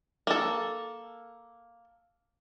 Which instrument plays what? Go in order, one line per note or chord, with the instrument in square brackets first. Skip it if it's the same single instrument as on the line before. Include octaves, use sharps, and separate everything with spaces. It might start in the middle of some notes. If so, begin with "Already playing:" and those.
[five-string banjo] A#3 A4